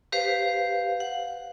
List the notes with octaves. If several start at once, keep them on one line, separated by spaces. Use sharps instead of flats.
G4 B4 C5 F5
F#5